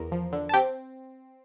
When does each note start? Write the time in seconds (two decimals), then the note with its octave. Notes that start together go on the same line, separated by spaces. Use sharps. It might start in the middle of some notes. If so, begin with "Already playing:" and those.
Already playing: E2 A#4
0.12 F3
0.33 D3
0.49 A5
0.54 C4 G4 G5